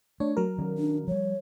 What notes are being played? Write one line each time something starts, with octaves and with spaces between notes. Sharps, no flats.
A3 D4 C#5
F#3 A#4
D#3 C#4
D4
F3 G3 C#5